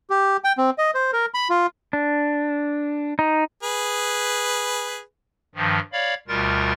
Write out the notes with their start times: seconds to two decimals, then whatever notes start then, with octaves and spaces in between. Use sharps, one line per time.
0.10 G4
0.44 G5
0.58 C4
0.78 D#5
0.95 C5
1.13 A#4
1.34 B5
1.50 F4
1.93 D4
3.19 D#4
3.63 G#4 B4
5.55 G2 D#3 F3
5.93 C#5 D5 F5 B5
6.28 D2 B2 G3 F4 A#4 A6